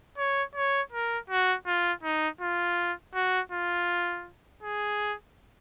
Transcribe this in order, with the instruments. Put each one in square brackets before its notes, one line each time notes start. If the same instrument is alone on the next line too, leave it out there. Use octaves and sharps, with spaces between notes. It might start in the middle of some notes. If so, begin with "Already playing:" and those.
[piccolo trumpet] C#5
C#5
A#4
F#4
F4
D#4
F4
F#4
F4
G#4